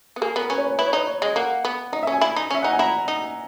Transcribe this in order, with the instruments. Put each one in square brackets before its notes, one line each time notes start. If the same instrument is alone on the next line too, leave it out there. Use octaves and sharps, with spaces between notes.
[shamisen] B3
[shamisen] A#3 [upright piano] G#4
[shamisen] B3 [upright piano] A#4
[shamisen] C#4 [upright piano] B4
[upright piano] C#5
B4
C#5
[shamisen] E4 [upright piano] B4
[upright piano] C#5
[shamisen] D#4 [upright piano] B4
[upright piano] C#5
[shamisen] G#3 [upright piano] D#5
[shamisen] A#3 [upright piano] F#5
[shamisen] B3
[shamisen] D#4 [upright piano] D#5
[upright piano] E5
[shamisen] C#4 [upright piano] G#5
[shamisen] E4
D#4
[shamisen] C#4 [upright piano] E5
[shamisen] D#4 [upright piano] F#5
[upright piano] G#5
[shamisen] E4 [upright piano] A#5
[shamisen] D#4